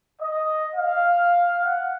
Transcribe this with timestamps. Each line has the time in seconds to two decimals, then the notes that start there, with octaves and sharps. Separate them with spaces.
0.21 D#5
0.75 F5
1.65 F#5